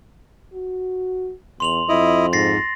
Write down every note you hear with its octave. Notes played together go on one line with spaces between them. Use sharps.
F#4
E2 C6 F7 F#7
F2 E4 D#5
G#2 A6 A#6 C7